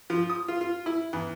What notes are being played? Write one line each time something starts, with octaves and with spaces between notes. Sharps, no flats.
F3
D#6
F4
F4
E4
E2